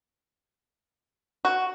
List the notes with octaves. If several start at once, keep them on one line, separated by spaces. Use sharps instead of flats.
F#4